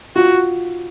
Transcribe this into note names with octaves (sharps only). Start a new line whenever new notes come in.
F4 F#4